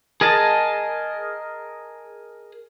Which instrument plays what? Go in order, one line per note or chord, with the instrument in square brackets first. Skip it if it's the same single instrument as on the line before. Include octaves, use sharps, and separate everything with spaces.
[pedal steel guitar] G#4 A#4 D#5 A5